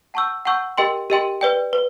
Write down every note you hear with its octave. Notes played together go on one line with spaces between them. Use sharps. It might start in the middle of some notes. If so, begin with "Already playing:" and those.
F#5 A5 C#6 E6 G6
F#5 A5 C#6 E6 G6
G4 A#4 D#5 G5 C6
G4 A#4 D#5 G5 C6
B4 D5 G5
B4